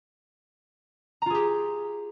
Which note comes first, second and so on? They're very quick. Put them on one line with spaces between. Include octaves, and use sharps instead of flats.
A#5 F4 G#4 G4